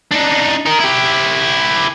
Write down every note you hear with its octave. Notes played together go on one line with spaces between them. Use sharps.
D4 D#4
D#4 A#4
E4 G4